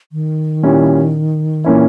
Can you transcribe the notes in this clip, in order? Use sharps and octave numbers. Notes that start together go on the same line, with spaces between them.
D#3
A#2 G3 C#4 E4
A#2 E3 A#3 C#4 E4